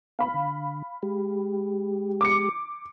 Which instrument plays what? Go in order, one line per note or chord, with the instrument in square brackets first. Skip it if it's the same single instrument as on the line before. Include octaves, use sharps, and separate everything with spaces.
[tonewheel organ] B3 [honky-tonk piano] F5 B5
[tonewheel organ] D3
G#3 G4
[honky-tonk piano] D6 C#7